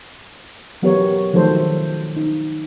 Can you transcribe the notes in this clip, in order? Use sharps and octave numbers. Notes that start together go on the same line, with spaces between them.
E3 F#3 B3 G4 A#4 C#5
D#3 F3 F#3 A3 A4 C5
D#4